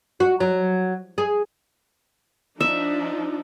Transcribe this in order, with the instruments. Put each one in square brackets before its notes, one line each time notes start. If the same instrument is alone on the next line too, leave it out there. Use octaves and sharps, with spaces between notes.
[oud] F#4
F#3
G#4
[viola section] F3 D4 D#4 [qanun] E5